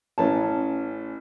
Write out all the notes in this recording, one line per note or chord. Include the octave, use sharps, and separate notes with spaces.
A1 C#4 A5